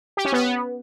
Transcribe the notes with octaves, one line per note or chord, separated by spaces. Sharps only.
G4
C#4
B3